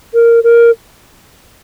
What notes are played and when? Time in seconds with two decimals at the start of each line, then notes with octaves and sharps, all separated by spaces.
0.14 A#4
0.44 A#4